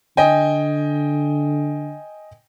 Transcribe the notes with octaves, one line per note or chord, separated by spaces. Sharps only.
D3 D#5 G5 G#5